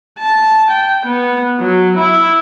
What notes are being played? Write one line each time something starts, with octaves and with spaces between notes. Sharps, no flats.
A5
G5
B3
F#3
E4